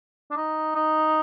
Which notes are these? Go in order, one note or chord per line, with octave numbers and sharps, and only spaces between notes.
D4
D#4
D#4